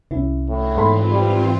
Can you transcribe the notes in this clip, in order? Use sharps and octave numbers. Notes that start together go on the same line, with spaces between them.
C2 C#4 E4
A2 D4 F#4 G#4
G#2 E3 C4 F4 A4 B5 C6
G3